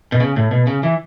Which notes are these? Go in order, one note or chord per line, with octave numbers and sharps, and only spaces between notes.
B2
C#3
A2
B2
C#3
E3